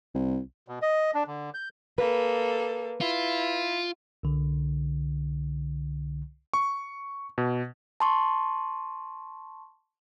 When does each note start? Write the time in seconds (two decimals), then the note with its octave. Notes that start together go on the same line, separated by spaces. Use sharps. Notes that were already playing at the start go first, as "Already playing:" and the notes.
0.14 C2
0.68 B2
0.82 D#5
1.15 D4
1.27 D3
1.54 G6
1.98 A#3 A4 B4
3.01 E4 F4
4.23 C2 D3
6.53 C#6
7.38 B2
8.00 A5 C6 C#6